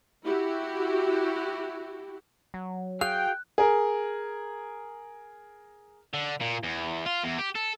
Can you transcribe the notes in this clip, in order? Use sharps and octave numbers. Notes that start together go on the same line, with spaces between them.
E4 F#4 G4
F#3
F#4 G#4 F5 G5 F#6
G#4 A#4
D3
A#2
E2
F4
E2
G4
A4